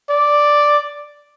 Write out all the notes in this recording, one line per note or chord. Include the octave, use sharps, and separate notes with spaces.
D5